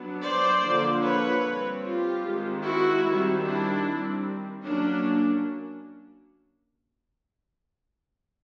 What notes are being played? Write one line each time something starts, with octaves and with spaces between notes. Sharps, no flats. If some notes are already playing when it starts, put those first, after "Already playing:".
Already playing: F#3 B3 D4
C5 D5
D3 F3 A#3
B4 C#5
G3 C4
F4 G4
D#3 G#3 C4
E4 F#4
D#3 G3 C4
D4 E4
D#3 G3 C4
F#3 A#3 C#4 D4